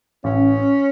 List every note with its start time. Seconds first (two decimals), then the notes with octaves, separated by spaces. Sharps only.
0.24 A1 C#4